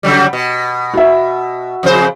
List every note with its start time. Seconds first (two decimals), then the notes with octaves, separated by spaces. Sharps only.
0.03 C#3 F#3 G3
0.33 B2
0.94 F#4 E5
1.83 F2 C#3 C5